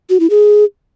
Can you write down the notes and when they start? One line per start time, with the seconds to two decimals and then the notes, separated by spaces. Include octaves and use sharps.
0.10 F#4
0.20 E4
0.30 G#4